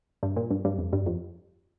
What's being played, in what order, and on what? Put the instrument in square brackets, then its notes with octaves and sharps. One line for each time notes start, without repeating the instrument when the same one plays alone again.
[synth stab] G2
A#2
G2
G2
F2
G2
F2